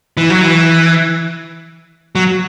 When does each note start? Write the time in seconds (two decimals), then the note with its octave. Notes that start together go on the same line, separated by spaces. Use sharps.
0.17 E3
0.30 F#3
0.42 E3
2.15 F#3